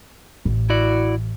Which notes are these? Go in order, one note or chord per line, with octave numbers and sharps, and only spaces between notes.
A1
E4 F#4 D5